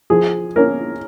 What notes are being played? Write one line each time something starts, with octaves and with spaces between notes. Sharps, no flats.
F3 G#4
A#3 C#4 A#4